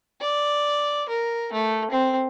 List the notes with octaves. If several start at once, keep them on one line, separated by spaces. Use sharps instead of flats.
D5
A#4
A3
C4